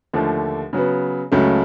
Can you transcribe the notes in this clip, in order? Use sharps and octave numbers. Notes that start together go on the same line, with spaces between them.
D#2 D3 F3 A3
C#3 F#3 B3
C#2 C#3 F#3 A3